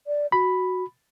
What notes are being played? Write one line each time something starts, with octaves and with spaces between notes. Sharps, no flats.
D5
F#4 B5